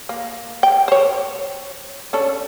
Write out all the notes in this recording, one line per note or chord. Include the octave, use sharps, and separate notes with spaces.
A#3
G5
C5 C#5
C#4 D4 A4